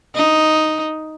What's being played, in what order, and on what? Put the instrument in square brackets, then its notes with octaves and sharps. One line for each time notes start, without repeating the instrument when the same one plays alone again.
[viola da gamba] D#4